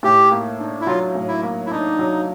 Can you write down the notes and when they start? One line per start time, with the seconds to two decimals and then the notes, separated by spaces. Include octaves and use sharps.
0.03 A2 G4
0.31 A#3
0.60 D4
0.81 E4
0.87 F#3 F4
1.15 A2
1.28 E4
1.43 A#3
1.66 E4
1.71 D4 D#4
1.99 F#3